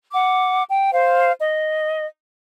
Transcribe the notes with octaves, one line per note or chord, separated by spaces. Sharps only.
F#5 D6
G5
C5 F5
D#5